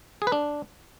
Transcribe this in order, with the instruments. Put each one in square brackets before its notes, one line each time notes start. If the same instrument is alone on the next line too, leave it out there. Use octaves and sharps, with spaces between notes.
[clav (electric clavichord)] G#4
B4
D4